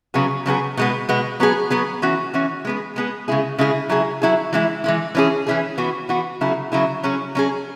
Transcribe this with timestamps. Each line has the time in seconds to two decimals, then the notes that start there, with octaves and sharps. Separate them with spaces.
0.14 C#3 F#3 B3 G#4
0.46 C#3 F#3 B3 G#4
0.77 B2 G#3 B3
1.09 B2 G#3 B3
1.40 F#3 B3 G#4
1.70 F#3 B3 G#4
2.02 E3 C#4 F#4
2.34 E3 C#4 F#4
2.65 G#3 B3 G#4
2.96 G#3 B3 G#4
3.28 C#3 G#3 E4 G#4
3.59 C#3 G#3 E4 G#4
3.89 F#3 E4 G#4
4.22 F#3 E4 G#4
4.53 E3 G#3 E4
4.84 E3 G#3 E4
5.15 E3 C#4 E4 G#4
5.47 E3 C#4 E4 G#4
5.78 E3 B3 F#4
6.09 E3 B3 F#4
6.41 C#3 F#3 E4 G#4
6.72 C#3 F#3 E4 G#4
7.03 F#3 C#4 G#4
7.35 F#3 C#4 G#4